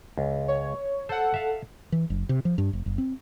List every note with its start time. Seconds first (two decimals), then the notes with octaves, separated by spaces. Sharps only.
0.18 C#2
0.48 C#5
1.09 A4 C5 F#5
1.34 E5 F5
1.92 E3
2.10 F#1
2.29 C3
2.45 F3
2.58 G2
2.73 F1
2.86 F#1
2.98 C4